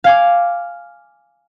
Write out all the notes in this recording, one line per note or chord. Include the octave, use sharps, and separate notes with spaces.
F5 G#5 D6